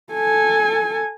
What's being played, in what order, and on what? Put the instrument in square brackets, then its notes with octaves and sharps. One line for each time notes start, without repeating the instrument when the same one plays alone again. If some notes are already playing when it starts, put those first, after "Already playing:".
[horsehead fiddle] A4 G#5